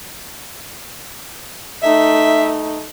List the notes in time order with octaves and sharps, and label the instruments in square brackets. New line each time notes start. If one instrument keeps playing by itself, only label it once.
[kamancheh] A3 D#4 [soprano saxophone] E5